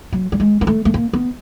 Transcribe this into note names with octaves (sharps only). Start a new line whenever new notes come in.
F#3
G3
G#3
A#3
A3
A3
A#3
B3